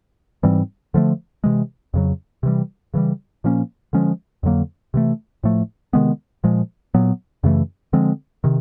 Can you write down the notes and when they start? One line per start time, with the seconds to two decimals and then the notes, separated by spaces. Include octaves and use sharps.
0.43 G#2 E3 G3 C4
0.94 D3 F3 A3
1.44 C3 E3 G#3
1.94 F2 C#3 F#3
2.43 C3 E3 G3
2.94 C#3 E3 G3
3.44 A#2 F3 A#3 C#4
3.93 D3 F3 G#3 C#4
4.43 F2 D3 F#3 A#3
4.94 C3 E3 A3
5.44 A2 F3 A3
5.93 C3 D#3 G#3 B3
6.44 A#2 F3 G#3
6.94 A#2 F#3 B3
7.44 F#2 C#3 E3 A3
7.93 D3 F3 G#3 C4
8.44 C3 D#3